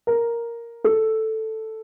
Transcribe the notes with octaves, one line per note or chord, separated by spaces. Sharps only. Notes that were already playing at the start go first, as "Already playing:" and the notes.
A#4
A4